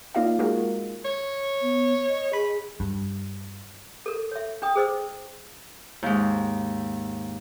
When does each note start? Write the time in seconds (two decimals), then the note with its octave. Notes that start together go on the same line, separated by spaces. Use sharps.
0.15 A#3 D#4 F4 D5 D#5 F5
0.39 G#3 F4 F#4 G#4 A#4
1.05 C#5
1.62 B3
2.09 D#5
2.33 G#4 B5
2.80 G2
4.06 A4 A#4
4.31 C#5 E5
4.62 D4 G5 D#6
4.75 G#4 C5 D#5 E6
6.03 D#2 G#2